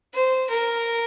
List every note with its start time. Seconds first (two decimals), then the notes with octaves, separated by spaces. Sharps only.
0.13 C5
0.49 A#4